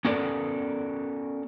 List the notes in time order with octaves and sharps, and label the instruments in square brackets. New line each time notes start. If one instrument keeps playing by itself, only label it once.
[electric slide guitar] B3 C#4 F#4 A4 A#4 D5